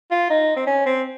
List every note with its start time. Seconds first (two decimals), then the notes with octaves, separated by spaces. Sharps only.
0.11 F4
0.30 D#4
0.56 C4
0.67 C#4
0.86 C4